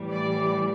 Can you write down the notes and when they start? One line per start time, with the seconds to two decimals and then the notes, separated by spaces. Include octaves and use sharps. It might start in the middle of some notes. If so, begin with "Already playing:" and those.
Already playing: A2 E3 G3
0.09 D5